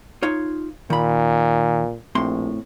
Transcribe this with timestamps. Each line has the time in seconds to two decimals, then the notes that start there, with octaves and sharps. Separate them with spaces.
0.23 D#4 F4 C#5
0.90 A#2 D#3 B5
2.15 A#1 A2 C4 C6